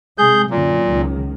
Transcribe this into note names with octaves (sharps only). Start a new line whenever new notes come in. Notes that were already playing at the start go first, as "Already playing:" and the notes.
C3 G#3 G#4 G6
F#2 A#2 D3 F#3
C#2 D#3